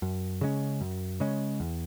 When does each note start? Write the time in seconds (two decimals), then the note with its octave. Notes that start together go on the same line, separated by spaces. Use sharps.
0.02 F#2
0.41 C#3 G#3 C#4
0.81 F#2
1.20 C#3 G#3 C#4
1.60 E2